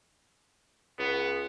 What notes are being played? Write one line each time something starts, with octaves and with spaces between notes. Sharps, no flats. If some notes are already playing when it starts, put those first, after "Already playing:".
C#2 B3